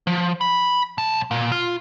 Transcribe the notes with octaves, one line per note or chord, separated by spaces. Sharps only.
F3
B5
B1 A5
A#2
F4